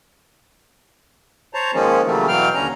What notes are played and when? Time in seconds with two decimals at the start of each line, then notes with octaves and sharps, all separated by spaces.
1.54 C5 C#5 A5 A#5
1.74 D#3 F3 G#3 A#3 C#4
2.06 C#3 E3 F#3 G3 A3 A#3
2.28 B2 E3 F#3 F5 G5 F6
2.55 D#2 D3 C#4 A#5